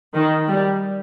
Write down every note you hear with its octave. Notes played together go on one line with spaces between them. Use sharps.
D#3
G3